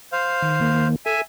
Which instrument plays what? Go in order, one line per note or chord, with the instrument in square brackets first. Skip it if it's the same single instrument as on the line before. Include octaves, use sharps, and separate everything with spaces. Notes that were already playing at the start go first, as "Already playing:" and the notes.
[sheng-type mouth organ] C5 F5
[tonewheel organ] D#3
D#3 A#3
[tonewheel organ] A4 [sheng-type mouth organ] E5 G#5